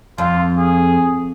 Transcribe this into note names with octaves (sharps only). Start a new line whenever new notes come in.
F2 F4
G#4